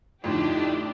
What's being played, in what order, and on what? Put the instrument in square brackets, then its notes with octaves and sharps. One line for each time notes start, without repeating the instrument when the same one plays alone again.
[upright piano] F2 A2 D3 [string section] D4 G4 [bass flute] D#4